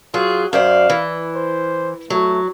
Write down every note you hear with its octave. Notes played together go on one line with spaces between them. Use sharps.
F#3 F4 G#4
F#2 C5 D5 F5
E3
C5
F#3 A3